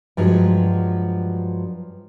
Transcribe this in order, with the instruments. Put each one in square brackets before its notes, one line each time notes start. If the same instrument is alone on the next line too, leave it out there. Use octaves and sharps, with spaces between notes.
[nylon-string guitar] G2 F3 F#3 G#3